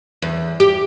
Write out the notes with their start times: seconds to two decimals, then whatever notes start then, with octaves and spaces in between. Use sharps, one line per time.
0.22 E2
0.60 G4